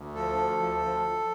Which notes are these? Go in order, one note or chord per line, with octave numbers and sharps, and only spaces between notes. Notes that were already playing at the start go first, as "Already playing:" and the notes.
Already playing: D2
F3 A4
D2
F3
F3